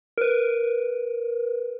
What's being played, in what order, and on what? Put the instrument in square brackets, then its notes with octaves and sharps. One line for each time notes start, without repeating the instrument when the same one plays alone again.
[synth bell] A#4 B4